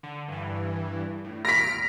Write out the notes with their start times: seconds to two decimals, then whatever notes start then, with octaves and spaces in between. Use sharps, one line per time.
0.03 D3
0.28 G2 E3
1.24 A2
1.45 F6 A#6 B6 D7